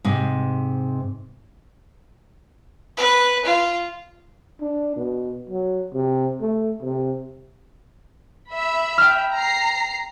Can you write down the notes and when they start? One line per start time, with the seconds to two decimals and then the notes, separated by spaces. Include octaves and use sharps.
0.05 G#2 C3
2.97 B4
3.45 F4
4.61 D4
4.96 B2
5.49 F#3
5.93 C3
6.41 A3
6.83 C3
8.50 E5 B5
8.98 G5 F6
9.33 A#5 C7